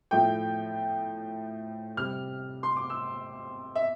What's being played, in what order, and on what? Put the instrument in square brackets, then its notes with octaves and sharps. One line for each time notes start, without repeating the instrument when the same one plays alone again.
[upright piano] A2 F3 A3 G5
C3 G3 F6
C6
D6
E6
E5